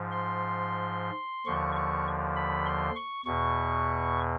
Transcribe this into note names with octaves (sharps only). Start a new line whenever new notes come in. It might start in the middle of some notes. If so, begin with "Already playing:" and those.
Already playing: G#2 F3
C6
D#2 D3 F3 C#6
C#6
B5
C6
C#6
E2 B2 C#6